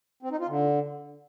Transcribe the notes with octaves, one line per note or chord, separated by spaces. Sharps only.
C4
D#4
F4
D3